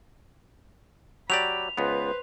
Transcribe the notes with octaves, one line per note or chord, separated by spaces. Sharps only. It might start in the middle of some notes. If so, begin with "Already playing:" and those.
F#3 G4 D5 B5 F7
C#2 B3 B4 C5